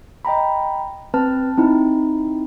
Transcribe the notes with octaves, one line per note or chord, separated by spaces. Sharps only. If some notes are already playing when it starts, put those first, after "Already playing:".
D#5 G5 A#5 B5
C4 B4 A5 F6
C4 D#4 E4